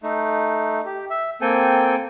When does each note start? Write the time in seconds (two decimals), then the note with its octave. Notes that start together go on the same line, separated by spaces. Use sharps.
0.03 A3 D#4
0.85 G4
1.10 E5
1.41 A#3 C4 A4 G5 G#5